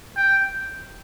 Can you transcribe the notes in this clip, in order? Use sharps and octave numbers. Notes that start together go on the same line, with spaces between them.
G5